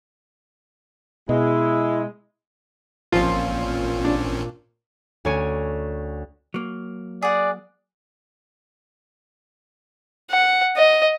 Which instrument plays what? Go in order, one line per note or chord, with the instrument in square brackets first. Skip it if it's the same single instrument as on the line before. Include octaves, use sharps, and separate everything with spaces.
[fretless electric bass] B2 [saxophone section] G#3 [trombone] E4
[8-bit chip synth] A1 C4 C#4 [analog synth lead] A#2 [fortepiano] F3 [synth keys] F4
[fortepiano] D4
[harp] D2 C#4 C#5 G#5 D7
[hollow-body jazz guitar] F#3 A#3
[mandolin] G#4 F#5 [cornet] D5
[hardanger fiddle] F#5
D#5